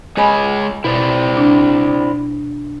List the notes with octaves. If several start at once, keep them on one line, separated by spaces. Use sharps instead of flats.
G#3 G#4 C#5 D#5 G#5 B5
B2 E4 C5 D5
D4